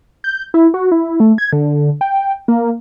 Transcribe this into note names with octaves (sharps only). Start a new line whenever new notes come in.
G6
E4
F#4
E4
A3
G#6
D3
G5
A#3